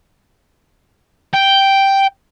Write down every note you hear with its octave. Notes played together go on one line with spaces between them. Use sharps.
G5